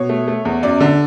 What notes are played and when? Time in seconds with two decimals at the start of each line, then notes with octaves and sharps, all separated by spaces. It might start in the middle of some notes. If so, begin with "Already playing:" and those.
Already playing: B2 C#5
0.09 A3
0.28 A3
0.45 E2
0.63 F#2 D5
0.80 D3